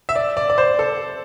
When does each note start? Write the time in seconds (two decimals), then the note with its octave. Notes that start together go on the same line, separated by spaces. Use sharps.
0.09 E5
0.16 D5
0.37 D5
0.50 D5
0.58 C5
0.79 A4